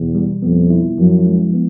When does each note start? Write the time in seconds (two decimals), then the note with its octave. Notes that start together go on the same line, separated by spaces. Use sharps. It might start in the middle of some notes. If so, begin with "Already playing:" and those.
Already playing: E2 B2
0.15 G3
0.42 F2 B3
0.70 E4
0.98 F#2 F3
1.25 G#3
1.54 B3